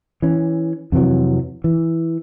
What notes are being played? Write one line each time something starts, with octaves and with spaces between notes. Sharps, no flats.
E3 C#4
F2 C3 E3 F#3
E3